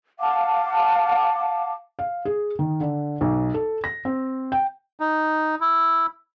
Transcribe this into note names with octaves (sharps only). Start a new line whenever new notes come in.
F5 F#5 A5 D6
F5
G#4
D#3
D3
B1
A4
A#6
C4
G5
D#4
E4